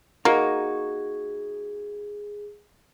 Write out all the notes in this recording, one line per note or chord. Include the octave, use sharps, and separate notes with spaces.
A#3 D#4 F#4 G#4